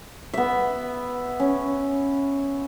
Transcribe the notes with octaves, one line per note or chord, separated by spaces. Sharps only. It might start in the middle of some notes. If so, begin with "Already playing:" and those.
B3 E5
C#4